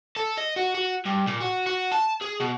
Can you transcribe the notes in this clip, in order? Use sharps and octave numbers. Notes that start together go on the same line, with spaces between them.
A4
D#5
F#4
F#4
G2
A#2
F#4
F#4
A5
G#4
B2